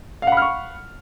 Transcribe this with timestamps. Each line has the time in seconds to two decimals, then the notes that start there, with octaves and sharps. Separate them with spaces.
0.22 F5
0.27 F#5
0.32 B5
0.37 F6
0.42 C#6